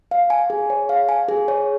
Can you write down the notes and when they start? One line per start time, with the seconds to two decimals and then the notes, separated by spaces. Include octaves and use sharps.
0.11 F5
0.30 G#5
0.50 G#4
0.70 C#5
0.89 F5
1.09 G#5
1.29 G#4
1.48 C#5